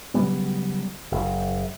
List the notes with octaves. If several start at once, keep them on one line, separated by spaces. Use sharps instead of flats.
C#3 F#3 G3 B3
F#1